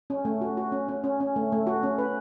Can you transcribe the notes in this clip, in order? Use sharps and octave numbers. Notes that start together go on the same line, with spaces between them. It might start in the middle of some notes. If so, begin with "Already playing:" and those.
C#4
A3
F#4
F#4
C#4
C#4
C#4
C#4
A3
A3
F#4
C#4
B4